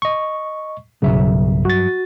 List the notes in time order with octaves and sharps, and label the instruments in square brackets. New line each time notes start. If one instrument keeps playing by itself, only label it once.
[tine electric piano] D#5 C#6
[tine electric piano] B1 C#3 [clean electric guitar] G2 F#3 E5
[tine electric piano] F#4 A6